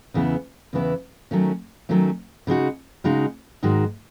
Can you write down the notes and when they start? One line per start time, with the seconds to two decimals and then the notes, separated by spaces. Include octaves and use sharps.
0.14 E2 C#3 E3 B3 E4
0.73 E2 C#3 E3 B3 E4
1.31 D#3 F#3 A3 C#4
1.89 D#3 F#3 A3 C#4
2.47 C#3 G#3 D#4 F#4
3.04 C#3 G#3 D#4 F#4
3.63 G#2 D#3 G#3 D#4 F#4